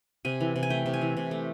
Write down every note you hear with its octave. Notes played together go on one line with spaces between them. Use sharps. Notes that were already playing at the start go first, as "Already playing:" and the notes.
C3 G#5
E3
C3
G#5
A3 G5
C3
G#5
E3
C3
A3